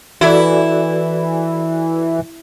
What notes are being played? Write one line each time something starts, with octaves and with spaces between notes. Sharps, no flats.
E3 E4 F#4 A4 D5